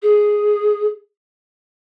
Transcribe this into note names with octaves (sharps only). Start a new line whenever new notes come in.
G#4